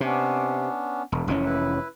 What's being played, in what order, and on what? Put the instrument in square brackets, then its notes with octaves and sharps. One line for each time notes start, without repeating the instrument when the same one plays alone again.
[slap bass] C3 [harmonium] B3 C#4 D4
[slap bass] E1
F1 E3 C#4
[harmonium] E4 B4